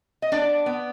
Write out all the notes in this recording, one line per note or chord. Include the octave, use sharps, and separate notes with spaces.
D#5
B3 D4 D5
B3